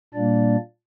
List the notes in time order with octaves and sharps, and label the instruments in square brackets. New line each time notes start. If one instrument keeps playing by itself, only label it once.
[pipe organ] A#2 G3 A#3 D4 D5